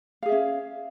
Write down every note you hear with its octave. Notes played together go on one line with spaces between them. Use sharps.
C#4 G#4 E5 F5